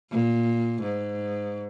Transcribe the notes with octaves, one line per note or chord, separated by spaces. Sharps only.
A#2
G#2